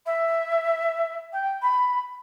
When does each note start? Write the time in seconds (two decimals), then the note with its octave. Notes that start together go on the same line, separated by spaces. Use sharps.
0.06 E5
1.33 G5
1.62 B5